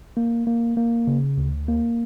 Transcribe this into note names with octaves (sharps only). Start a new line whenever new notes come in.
A#3
A#3
A#3
C#3
D2
A#3